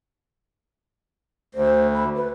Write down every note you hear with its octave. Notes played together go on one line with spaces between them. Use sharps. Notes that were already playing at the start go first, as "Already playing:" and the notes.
D2 C5
B5
B4